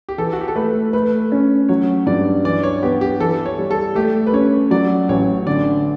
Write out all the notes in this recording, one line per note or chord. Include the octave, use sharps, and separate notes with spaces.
G4
E3 A4
F#4
G4
A4
A3 B4
A3 B4
C#4
F#3 C#5
G2 D5
E3 D5
C#5
B3 G4
G4
E3 A4
C#5
G3
A4
A3 G4
B4
C#4 C#5
F#3 D5
A1 C#5
D3 D5